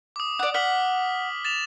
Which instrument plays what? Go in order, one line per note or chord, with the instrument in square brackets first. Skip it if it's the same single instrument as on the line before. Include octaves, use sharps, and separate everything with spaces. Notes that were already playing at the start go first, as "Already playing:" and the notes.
[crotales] D6 D#6
[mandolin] D5 F#5
[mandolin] F#5 [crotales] F6 B6 F#7
[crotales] A6 E7 F7